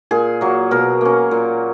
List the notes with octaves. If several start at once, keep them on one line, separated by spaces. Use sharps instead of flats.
A#2 G#4
F#3 A#3
B2 A#4
A#3 C#4
A#2